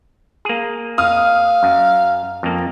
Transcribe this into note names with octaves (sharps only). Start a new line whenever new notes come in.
A#3 G#4
F5 D#6 F6
F#2
F2 A#3